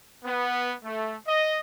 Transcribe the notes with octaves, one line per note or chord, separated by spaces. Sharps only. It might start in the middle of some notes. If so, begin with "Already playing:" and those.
B3
A3
D#5